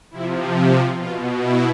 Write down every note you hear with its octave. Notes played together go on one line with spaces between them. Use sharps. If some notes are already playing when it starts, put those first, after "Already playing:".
C3 F3 E4
G4
B2 F4
E4